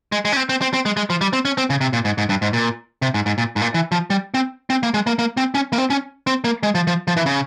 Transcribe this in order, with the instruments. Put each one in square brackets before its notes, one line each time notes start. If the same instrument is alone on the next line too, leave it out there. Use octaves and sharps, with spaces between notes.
[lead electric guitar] G#3
G#3
C#4
C4
C4
C4
C4
G#3
G#3
F3
G3
C4
C#4
C4
C#3
C3
A#2
G#2
G#2
G2
G#2
A#2
C3
G#2
G#2
A#2
G#2
A#2
E3
F3
G3
C4
C4
A#3
G#3
A#3
A#3
C4
C#4
A#3
C4
C#4
C4
A#3
G#3
F3
F3
F3
E3
C#3